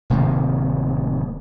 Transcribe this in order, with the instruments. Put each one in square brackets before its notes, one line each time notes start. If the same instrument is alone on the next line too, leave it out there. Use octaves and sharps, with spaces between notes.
[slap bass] D1 C3 D#3 A#3